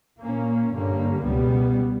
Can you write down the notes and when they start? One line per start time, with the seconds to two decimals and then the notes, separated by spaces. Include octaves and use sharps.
0.20 A#2 A#3 C#4
0.72 G2 D3 A#3 C#4
1.24 C#2 B2 G3 B3